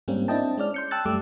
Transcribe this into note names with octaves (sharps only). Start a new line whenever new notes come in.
G#2 G3 A#3 C4 C#4
C4 D4 E4 D#5 G5 A5
G#3 C#4 D5 F6
C6 G6 C#7
G5 A5 E6 F#6 A6
F#2 G3 A3 D6 E6